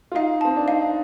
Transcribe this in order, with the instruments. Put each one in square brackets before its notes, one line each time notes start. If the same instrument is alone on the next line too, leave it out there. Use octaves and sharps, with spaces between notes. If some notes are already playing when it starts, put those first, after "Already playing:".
[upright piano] F4
[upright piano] D#4 [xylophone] F5
[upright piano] C4 [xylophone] A5
[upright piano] D4
[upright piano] D#4 [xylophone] F5